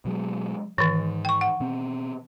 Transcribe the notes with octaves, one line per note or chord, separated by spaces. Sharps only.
B2 F#3 G#3
G#2 D#3 E3
G5 C#6
F#5
B2 C4